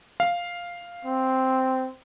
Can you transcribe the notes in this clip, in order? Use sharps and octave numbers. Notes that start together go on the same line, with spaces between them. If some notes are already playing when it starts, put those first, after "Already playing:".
F5
C4